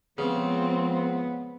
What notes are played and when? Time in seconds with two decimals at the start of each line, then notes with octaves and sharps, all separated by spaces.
0.18 C#3 F3 G#3 B3 C4